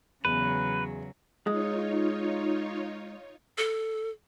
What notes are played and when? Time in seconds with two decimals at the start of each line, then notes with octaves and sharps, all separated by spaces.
0.25 E2 C#3 F#3 B4
1.47 G#3 D#4 F4 C#5
3.58 A4